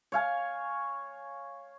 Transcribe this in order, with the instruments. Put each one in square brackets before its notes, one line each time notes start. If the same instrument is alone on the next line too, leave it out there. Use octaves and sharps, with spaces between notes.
[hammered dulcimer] C#5 F5 G#5